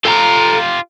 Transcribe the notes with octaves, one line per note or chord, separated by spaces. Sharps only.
F4 G4 A4 G#5 A#5